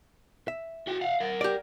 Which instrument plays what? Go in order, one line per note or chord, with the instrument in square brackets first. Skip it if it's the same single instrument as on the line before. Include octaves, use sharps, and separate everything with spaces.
[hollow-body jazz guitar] E5
[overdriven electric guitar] F#4 G5
F5 F#5
A#4 F#5
[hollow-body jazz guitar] G4 D5